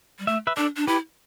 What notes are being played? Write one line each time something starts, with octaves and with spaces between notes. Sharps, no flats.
G3
A3 E5
B4 E5
D4 A4 D5
D4
E4 G4 B4